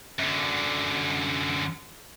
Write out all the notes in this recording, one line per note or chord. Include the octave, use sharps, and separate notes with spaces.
F#2 D3